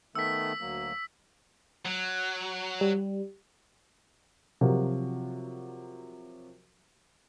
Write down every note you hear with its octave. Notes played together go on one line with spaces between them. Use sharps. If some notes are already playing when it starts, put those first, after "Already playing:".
D#3 A3 B3 E6 B6
D2 F#3 A#3
F#3
G3
C3 F3 F#3 F#4 A#4